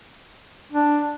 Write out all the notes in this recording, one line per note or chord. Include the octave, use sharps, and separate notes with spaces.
D4